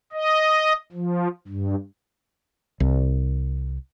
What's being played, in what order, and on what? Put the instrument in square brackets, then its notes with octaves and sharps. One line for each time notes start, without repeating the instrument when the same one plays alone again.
[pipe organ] D#5
F3
G2
[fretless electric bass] C2